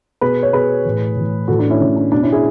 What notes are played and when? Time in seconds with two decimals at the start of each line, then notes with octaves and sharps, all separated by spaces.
0.21 B2 G#4 B4
0.43 C#5
0.53 B2 G#4 B4
0.85 A2 E3
1.17 A2 E3
1.48 A2 E3 F#4 A4
1.59 D4 F#4
1.70 C#4 E4
1.80 A2 E3 C#4
1.96 D4
2.12 B2 D4
2.22 C#4 E4
2.32 E4 G#4